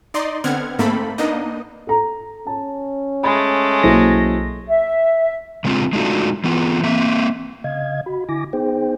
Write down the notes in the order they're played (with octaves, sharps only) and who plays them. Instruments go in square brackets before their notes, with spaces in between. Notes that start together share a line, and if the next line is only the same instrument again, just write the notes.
[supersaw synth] D#4 D5 D#5 C6
D3 B3 C4 F#5 F6 G#6
G#2 A3 A#3 C4 A4 B5
A#3 B3 D4 D#4 D#5
[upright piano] A4 A#5
[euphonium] C#4 [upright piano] A5
[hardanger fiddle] G#3 A3 [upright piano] B5
[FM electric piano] B1 A#3 A#6 [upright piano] F#3 E4 C5
[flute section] E5
[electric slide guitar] C#3 G#3 C4 F4
G#3 A3 D4 D#4 F4 F#4
E3 B3 F4
A#3 C4 E5
[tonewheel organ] C#3 D#5 F5 G#6
F#4 B5
D3 E4 G#5 D6 A#6
B3 D#4 G#4 C5 G5